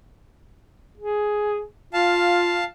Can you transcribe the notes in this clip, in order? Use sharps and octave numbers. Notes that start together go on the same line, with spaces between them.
G#4
F4 F5 A5